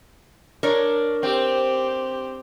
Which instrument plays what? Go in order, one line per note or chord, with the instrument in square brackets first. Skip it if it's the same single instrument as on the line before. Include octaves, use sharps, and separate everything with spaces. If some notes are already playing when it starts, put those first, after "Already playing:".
[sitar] D4 [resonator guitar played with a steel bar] A#4 C#5
[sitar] C4 [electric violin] G4